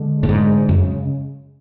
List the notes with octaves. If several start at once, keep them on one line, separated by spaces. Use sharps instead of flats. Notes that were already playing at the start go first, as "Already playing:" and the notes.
Already playing: D3 G#3
A2
G#2 G#3
F#2 C#3